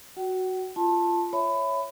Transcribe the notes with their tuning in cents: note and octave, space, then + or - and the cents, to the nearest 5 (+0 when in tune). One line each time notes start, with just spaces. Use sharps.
F#4 +0 F#5 +45
F4 -15 A5 +0 C6 +35
C#5 +0 E5 +0 B5 +20